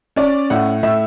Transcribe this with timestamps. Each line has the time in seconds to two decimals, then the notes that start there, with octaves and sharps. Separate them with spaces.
0.16 C#4 D5
0.50 A2 F#5
0.83 A2 E5